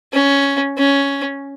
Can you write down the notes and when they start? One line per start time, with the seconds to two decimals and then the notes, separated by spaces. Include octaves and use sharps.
0.13 C#4
0.78 C#4